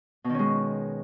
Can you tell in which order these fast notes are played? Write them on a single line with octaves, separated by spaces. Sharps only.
B2 D#3 C#4 G#3